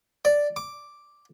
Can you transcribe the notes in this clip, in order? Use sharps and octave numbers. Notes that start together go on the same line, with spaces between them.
D5
D6